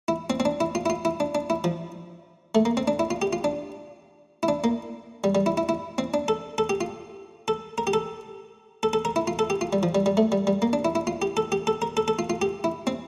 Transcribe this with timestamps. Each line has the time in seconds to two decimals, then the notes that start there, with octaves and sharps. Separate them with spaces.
0.08 E4
0.30 C4
0.40 C4
0.45 D4
0.60 E4
0.75 F4
0.86 E4
0.90 F4
1.05 E4
1.20 D4
1.35 D4
1.50 E4
1.64 F3
2.55 A3
2.65 A#3
2.77 C4
2.88 D4
2.99 E4
3.11 F4
3.22 G4
3.33 F4
3.44 D4
4.43 E4
4.48 D4
4.64 A#3
5.24 G3
5.35 G3
5.46 E4
5.57 E4
5.69 E4
5.98 C4
6.14 D4
6.28 A4
6.58 A4
6.69 G4
6.81 F4
7.48 A4
7.78 A#4
7.87 G4
7.93 A4
8.83 A4
8.93 A4
9.05 A#4
9.16 E4
9.27 F4
9.39 A4
9.50 G4
9.61 F4
9.73 G3
9.83 F3
9.95 G3
10.06 G3
10.17 A3
10.32 G3
10.47 G3
10.62 A#3
10.73 D4
10.85 E4
10.95 E4
11.07 F4
11.22 G4
11.37 A4
11.52 G4
11.67 A4
11.82 A#4
11.97 A4
12.08 A4
12.19 F4
12.30 F4
12.42 G4
12.64 E4
12.87 C4